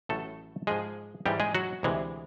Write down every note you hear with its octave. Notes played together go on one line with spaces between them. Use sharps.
A1 A2 F#3 A3 A4
G#2 F3 G#3 G#4
G#2 E3 G3 G#3 G4
G#3 G#4
F#3 F#4
D2 C3 E3 G#3